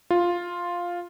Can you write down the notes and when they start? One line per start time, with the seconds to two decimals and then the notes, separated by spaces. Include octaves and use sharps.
0.10 F4